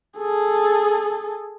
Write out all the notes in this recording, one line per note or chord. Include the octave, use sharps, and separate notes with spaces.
G#4 A4